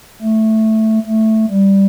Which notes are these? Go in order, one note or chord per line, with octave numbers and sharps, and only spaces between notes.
A3
A3
G3